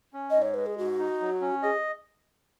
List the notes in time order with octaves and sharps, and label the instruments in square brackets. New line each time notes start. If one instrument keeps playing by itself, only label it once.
[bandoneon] C#4
[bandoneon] G#2 [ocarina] D#5
[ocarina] C#5
[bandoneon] G#3 [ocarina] B4
[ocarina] G#4
[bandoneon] G#2 [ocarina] F#4
[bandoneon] D#4
F#3
C#4
[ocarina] G#4 [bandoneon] D#5